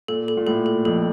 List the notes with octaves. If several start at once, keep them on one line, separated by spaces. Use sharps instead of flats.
A#2 A4
A4
A#2
A2 A4
A4
F2 A4